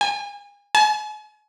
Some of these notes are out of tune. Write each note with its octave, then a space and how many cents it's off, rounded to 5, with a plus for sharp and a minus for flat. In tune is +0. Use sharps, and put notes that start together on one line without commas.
G#5 -35
G#5 +40